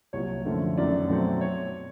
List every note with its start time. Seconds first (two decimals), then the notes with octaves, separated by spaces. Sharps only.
0.13 C2 A#2 F#3 C#5
0.45 F#2 D3 F3 A3
0.77 F#2 D#3 F#3 A3 D5
1.09 B2 F#3 A3 C4
1.41 C#5